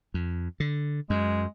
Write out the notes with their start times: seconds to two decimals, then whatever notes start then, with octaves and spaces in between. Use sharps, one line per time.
0.14 F2
0.60 D3
1.10 F#2 G#3